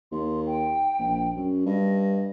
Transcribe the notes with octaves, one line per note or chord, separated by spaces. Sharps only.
D#2 C6
G5
A#1
F#2
G2 D#5